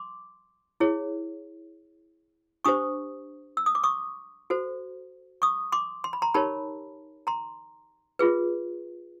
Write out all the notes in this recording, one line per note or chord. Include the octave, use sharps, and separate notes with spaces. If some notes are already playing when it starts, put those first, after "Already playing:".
Already playing: C6 D6
E4 G#4 C#5
D4 G4 C5 C#6 D#6
E6
D#6
D6
C#6 D#6
F#4 A4 C5
C#6 D#6
C6 D6
C6
B5
A#5 C6
D#4 G4 A#4 C#5 A5 B5
A#5 C6
F4 G#4 B4